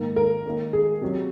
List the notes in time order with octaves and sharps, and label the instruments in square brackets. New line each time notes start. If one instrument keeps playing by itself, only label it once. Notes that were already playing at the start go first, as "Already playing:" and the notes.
Already playing: [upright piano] G#2 D#3 A#3
A#4
D#3 A#3 C#4
G#4
C3 F#3 C#4